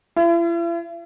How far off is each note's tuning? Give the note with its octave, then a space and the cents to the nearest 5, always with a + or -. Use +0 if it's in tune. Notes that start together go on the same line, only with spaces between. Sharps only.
E4 +45